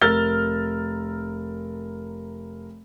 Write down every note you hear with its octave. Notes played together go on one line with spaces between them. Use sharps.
F1 A#4 E6 F6 A6 G7